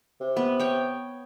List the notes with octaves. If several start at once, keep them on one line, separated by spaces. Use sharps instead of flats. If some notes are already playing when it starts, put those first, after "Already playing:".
C3
B3
C#5 G5